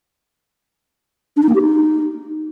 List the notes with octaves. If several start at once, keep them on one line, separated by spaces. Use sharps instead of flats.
D4
D#4
A#3
G4
D#4